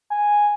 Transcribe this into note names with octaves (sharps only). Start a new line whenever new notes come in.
G#5